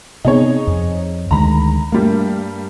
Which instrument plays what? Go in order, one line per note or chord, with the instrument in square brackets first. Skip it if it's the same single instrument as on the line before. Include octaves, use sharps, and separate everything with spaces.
[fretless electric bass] C3 B3 C4 [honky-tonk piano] D#4 G#4 C#5
[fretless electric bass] F2
[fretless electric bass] D2 D#3 G#3 [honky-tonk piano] A#5 B5
[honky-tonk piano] G2 G3 A#3 [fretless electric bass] A3